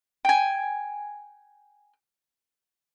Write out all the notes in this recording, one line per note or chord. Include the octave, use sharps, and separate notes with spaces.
G5 G#5